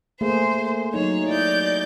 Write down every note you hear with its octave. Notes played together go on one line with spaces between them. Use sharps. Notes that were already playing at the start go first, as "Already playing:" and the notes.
A3 A#3 G#4 C5
F#3 D#4 C#5
E4 D5 D#5 G6